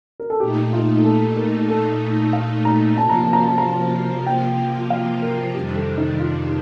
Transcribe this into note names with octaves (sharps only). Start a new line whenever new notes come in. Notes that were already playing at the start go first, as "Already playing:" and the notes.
A#4
A4
A#2 A3 D#4 G4
F4
A4
A#4
A4
F5
A#5
C3 F3 A#3 F4 A5
A#5
A5
A#5
A5
A#5
A5
G5
F5
A#4
F2 C3 D#3 G3 D4 G4
A4
D#4
F4